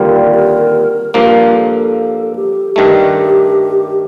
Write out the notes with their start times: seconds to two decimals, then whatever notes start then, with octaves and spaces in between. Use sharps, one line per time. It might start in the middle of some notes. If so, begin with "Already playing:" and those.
Already playing: D#2 D3 G3 C4 F4 A#4
0.34 A#4
1.14 G2 F3 A#3 A#4
1.55 A4
2.35 G4
2.76 G2 D#3 A3 G4